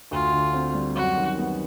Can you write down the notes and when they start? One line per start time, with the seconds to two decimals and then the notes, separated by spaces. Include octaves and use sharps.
0.11 D2 F4
0.32 D3
0.54 C4
0.74 G3
0.96 F#2 F#4
1.17 D#3
1.38 B3